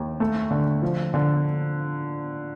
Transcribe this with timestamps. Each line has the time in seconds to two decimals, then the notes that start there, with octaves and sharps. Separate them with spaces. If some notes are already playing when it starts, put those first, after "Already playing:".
Already playing: D#2
0.20 A3
0.51 D3
0.82 F3
1.14 D3